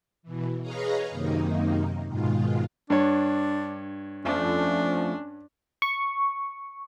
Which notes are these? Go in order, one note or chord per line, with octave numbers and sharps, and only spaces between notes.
B2 E3
G#4 B4 C#5 D#5 F5 A#5
F#2 C3 D#3 A#3 D#4
G#2 B2 D#3 G#3 F4
G2 D4 C#5
F2 F3 A3 C#4 D4
C#6